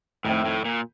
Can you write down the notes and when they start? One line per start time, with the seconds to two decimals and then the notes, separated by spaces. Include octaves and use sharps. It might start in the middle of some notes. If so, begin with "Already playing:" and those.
0.25 F2 A2 D#3 A3 C4
0.45 A2
0.65 A#2